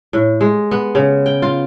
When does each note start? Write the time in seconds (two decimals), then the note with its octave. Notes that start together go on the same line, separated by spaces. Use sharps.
0.13 A2
0.41 G#3
0.71 B3
0.95 C#3
1.26 G5
1.42 F4